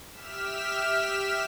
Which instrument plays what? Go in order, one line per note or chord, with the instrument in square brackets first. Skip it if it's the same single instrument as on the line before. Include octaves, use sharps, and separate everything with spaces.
[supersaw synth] G4 E5 F6 B6 E7